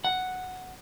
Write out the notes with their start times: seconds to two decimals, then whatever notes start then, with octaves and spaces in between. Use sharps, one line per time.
0.04 F#5